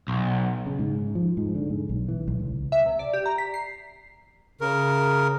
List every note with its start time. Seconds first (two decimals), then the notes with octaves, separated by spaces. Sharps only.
0.08 B1
0.66 C#3
0.79 G#2
1.15 F3
1.37 G#2
1.55 D3
1.70 G#2
1.89 B1
2.08 E3
2.28 B1
2.40 C#2
2.72 E5
2.86 C3
2.99 D5
3.13 G4
3.26 A#5
3.38 B6
3.54 C7
4.61 C#3 A#4